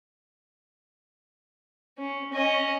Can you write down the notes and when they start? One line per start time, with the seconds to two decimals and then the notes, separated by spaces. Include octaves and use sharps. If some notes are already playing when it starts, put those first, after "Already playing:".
1.98 C#4
2.32 C#4 D#5